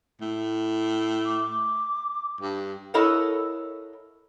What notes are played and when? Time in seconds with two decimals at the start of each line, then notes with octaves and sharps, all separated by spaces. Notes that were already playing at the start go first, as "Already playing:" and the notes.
0.21 A2
1.25 D6
2.41 G2
2.94 E4 A4 A#4 C#5 D#5 F#5